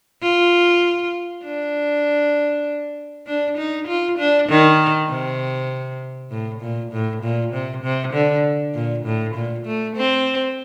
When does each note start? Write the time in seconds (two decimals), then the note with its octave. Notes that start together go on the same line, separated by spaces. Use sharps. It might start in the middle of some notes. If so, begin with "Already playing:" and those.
0.22 F4
1.44 D4
3.27 D4
3.57 D#4
3.88 F4
4.18 D4
4.49 D#3
5.09 C3
6.30 A2
6.61 A#2
6.92 A2
7.22 A#2
7.53 C3
7.83 C3
8.13 D3
8.74 A#2
9.05 A2
9.35 A#2
9.66 A3
9.96 C4